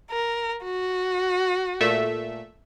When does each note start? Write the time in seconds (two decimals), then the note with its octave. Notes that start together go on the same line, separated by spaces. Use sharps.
0.11 A#4
0.64 F#4
1.81 A#2 A3 E5